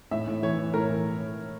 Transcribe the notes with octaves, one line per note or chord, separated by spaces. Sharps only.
A2 E5
A2
E3 C#5
E3
A2 A#4
E3